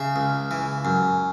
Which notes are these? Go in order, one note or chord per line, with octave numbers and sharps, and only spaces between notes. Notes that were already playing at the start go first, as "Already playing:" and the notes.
Already playing: C#3 E5
C#2
E3
F#2